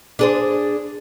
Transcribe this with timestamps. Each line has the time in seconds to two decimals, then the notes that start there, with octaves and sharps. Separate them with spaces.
0.19 D4 G#4 C5